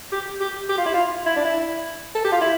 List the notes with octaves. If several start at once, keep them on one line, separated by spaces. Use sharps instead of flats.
G4
G4
G4
F4
E4
F4
E4
D4
E4
A4
G4
F4
E4